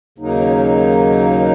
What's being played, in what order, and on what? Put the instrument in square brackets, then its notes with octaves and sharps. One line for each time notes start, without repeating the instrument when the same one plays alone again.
[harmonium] D#2 C#3 F#3 A#3 D#4